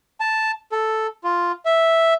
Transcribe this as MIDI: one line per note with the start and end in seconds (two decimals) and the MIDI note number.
0.20 0.51 81
0.72 1.07 69
1.24 1.52 65
1.65 2.14 76